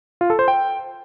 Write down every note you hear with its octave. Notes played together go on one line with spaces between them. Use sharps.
F4
A4
C5
G5